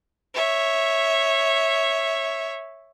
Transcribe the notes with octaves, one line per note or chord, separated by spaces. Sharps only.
C#5 E5